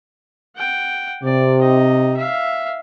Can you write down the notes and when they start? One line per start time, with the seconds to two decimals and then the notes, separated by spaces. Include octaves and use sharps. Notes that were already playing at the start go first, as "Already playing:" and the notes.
0.57 F#5 G5
1.24 C3 D5
1.60 D#4 D#5
2.17 E5 F5